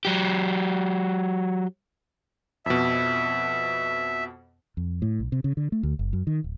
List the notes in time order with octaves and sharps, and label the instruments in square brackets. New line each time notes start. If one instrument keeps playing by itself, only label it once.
[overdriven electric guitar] F#3 G4
[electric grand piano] F2 B2 [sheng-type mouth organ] E5
[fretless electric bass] F2
A2
B1
C3
C#3
D3
A3
D2
F#1
F#2
D#3
D1